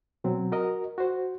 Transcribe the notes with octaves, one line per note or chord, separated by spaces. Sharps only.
B2 F#3 C4
F#4 A#4 D#5
F#4 C5